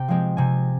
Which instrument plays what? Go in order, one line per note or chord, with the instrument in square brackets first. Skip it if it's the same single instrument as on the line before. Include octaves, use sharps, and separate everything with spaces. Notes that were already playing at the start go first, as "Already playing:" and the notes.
Already playing: [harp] C3 G5
F3 G#3 C4
C3 G#5